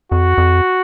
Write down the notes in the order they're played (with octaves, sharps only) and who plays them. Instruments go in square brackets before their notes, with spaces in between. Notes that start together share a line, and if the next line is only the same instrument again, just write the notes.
[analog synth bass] F2 [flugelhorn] F#4
[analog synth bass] F2